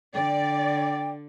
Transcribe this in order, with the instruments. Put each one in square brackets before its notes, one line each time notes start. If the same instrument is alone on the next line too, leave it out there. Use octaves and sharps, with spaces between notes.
[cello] D3 [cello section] D5 [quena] G5